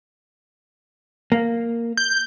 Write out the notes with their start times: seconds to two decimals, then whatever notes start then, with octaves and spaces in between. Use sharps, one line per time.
1.32 A#3
1.97 G6